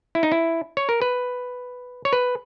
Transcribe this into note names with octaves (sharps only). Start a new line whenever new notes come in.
E4
D#4
E4
C#5
A#4
B4
C#5
B4